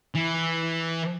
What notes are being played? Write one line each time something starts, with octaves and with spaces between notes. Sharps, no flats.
E3